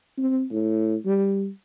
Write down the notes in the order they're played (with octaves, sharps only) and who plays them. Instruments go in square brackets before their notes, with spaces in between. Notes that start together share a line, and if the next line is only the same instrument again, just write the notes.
[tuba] C4
A2
G3